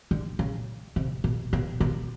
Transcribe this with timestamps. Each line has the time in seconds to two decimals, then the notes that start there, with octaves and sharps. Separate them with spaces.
0.11 D3
0.39 C#3
0.96 C3
1.24 B2
1.53 B2
1.80 B2